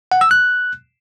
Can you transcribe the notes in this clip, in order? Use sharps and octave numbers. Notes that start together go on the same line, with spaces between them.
F#5
E6
F#6